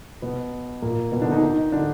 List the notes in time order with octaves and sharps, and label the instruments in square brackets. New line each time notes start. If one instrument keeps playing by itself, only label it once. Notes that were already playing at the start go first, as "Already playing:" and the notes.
[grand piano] B2 B3
A#2 A#3
B2 B3
D3 D4
D#3 D#4
D#3 D#4
D3 D4